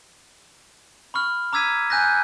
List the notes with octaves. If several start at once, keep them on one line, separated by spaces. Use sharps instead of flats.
B5 C#6 F6
A#5 D6 E6 G#6 B6 D#7
G#5 F#6 G6 A#6